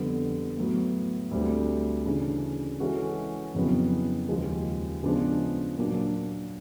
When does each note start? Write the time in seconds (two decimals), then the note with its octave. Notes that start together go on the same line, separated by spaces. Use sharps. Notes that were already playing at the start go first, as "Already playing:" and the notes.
Already playing: F2 D3 G3 B3
0.57 A2 F#3 B3
1.31 D2 D3 G3 C4
2.05 C#3 E3 A3 D4
2.80 E3 G#3 C#4 F#4 A4
3.54 F2 C#3 F#3 B3 E4
4.29 D#2 C#3 F3 G#3
5.03 C#3 F3 G#3 B3 D4
5.77 A#2 F#3 A#3 D4